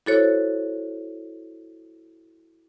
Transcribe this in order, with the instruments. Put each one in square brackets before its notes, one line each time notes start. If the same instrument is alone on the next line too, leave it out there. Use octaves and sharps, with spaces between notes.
[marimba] E4 F#4 A4 C5 C#5